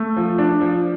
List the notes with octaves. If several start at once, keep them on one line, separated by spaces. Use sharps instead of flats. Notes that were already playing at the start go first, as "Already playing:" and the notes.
Already playing: A3
F3
D4
F3